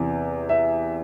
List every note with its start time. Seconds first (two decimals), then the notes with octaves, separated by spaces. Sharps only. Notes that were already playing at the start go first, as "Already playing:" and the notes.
Already playing: E2 C3 E3
0.49 E5